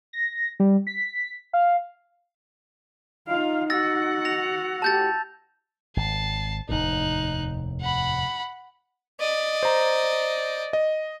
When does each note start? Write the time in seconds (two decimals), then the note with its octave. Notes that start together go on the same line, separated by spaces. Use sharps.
0.13 A#6
0.60 G3
0.87 B6
1.53 F5
3.27 D#4 F4 F5
3.70 F#4 F#5 E6 A6 A#6
4.25 A#6 F7
4.82 A2 G4 A5 G6 A6
5.97 G#1 A5 C7
6.69 F1 D#2 A2 D#4 F#6
7.81 F#5 B5
9.20 D5 D#5
9.63 C5 A#5
10.73 D#5